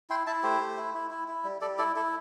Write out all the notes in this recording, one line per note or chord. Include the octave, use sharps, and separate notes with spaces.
E4 G5 C6
E4 E5 A5
A3 G4 C5
A3
E4
E4
E4
E4
G3
G3 A4 D5
E4 A4 D5
E4 A4